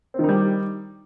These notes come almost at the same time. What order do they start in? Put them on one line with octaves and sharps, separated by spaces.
C4 D#3 D#4 G3